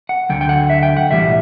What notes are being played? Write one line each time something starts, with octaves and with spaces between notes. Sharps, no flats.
F#5
D2 D3 F#3 G5
G5
F#5
E5
G5
F#5
B1 A2 E3 G3 E5